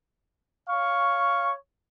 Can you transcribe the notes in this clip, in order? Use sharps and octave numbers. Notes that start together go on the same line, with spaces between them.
C#5 F5 C#6